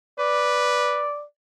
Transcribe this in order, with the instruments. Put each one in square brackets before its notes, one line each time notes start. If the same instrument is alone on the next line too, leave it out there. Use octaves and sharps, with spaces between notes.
[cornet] B4 [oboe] D5